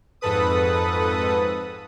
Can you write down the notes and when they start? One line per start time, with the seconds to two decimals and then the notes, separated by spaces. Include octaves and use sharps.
0.21 F2 G#2 A4 B4 D#6